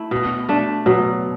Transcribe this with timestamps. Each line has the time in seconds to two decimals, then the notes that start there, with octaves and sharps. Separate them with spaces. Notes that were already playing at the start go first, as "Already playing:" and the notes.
Already playing: A3 E4
0.11 B2
0.49 A3 D4
0.86 B2 F#3